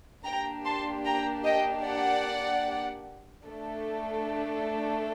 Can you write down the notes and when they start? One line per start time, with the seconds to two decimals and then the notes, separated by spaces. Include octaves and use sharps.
0.25 A#3 D4 G4 G5 A#5
0.65 A5 C6
1.05 G5 A#5
1.45 D#5 G5
1.85 D5 F#5
3.47 A3 D4 A4